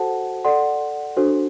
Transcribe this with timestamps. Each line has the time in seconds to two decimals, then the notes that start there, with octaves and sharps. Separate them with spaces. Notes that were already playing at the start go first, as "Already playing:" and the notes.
Already playing: F#4 A4 C5 F#5 A5
0.45 A4 D5 F#5 C6
1.17 D4 F#4 A4 C5